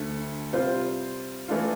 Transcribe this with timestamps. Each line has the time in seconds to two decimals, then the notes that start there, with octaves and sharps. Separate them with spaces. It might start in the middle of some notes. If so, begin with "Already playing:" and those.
Already playing: D2 D3 A3
0.53 C3 G3 C4 F4 C5
1.48 E3 A3 D4 F4